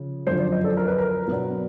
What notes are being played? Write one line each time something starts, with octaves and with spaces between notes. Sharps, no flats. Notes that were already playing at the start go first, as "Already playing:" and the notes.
Already playing: C#3 F3
F#2 D3 F3 C5
D5
D#5
A4
A#4
B4
A#4
B2 F#3 B3 D4